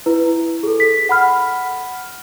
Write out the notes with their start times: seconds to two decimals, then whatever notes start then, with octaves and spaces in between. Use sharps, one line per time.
0.06 E4 B4
0.63 G#4 A4
0.80 B6
1.09 F#5 B5 F6